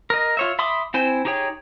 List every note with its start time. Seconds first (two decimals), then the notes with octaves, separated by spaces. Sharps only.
0.10 A#4 D#5
0.37 F4 C#5 E5
0.59 E5 B5 C6 D6 D#6
0.94 C4 E4 C5 G#5
1.25 D#4 G4 G#4 C#5 G5